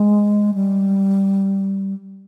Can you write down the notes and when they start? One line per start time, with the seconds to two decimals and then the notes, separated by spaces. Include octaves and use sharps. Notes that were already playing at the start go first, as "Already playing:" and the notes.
Already playing: G#3
0.54 G3